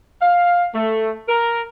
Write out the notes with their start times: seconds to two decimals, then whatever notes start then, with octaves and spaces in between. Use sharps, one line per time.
0.21 F5
0.74 A3
1.28 A#4